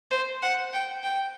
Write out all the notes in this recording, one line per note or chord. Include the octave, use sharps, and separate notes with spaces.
C5
F#5
G5
G5